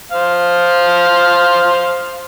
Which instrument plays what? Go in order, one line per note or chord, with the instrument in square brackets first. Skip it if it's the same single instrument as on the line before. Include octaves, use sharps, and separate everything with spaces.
[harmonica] C5 F5